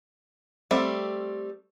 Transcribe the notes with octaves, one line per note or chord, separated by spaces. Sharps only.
G3 A3 C4 E5